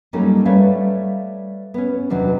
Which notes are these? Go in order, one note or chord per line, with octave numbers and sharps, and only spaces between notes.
F#3 G3 A3 A#3 C#4 D#4
G3 A3 B4 C#5 E5 F5
B3 C#4
E2 C3 D#3 F#3 D4 B4